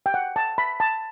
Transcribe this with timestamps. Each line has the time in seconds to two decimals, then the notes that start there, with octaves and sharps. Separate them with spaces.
0.06 G5
0.14 F#5
0.36 A5
0.58 B5
0.80 A5